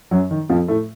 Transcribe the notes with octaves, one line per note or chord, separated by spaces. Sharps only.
F#2 F#3
D#3
F2 F3
A2 A3